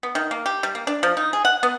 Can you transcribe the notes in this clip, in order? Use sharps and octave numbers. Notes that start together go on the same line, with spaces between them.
B3
D#3
A#3
G4
G3
A#3
D4
F3
D#4
G#4
F#5
B3